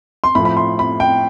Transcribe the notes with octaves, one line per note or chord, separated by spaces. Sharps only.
C6
A2 F3 B5
B5
C6
B5
G5